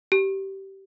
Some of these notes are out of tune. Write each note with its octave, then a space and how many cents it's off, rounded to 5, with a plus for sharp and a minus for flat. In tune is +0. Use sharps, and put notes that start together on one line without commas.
G4 -20